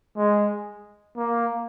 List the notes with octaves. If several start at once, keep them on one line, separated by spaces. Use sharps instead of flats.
G#3
A#3